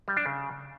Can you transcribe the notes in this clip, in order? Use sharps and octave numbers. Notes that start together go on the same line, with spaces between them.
G3
D4
C#3